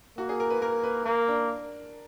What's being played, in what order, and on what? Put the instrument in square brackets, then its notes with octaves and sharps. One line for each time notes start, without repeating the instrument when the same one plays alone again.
[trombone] A#3 [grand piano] F#4
[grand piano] G#4
A#4
B4
[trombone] A#3 [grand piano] A#4
[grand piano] B4
[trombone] A#3 [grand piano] A#4
[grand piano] D4